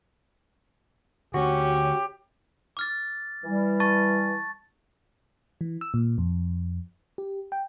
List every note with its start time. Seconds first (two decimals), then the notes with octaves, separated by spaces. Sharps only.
1.34 D3 A3 C#4 F#4 G4
2.77 D6 F6 A6
3.44 E3 G3
3.80 A5 C#6 A6
5.61 E3
5.81 E6
5.94 A#2
6.18 F2
7.18 G4
7.52 G5